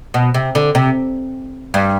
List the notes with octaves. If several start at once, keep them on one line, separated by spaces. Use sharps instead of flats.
B2
C3
D3
C3
G2